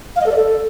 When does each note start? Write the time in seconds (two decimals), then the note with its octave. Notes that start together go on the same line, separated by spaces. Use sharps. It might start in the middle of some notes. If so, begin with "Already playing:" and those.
0.16 F5
0.21 D#5
0.26 A4
0.31 D5
0.36 A4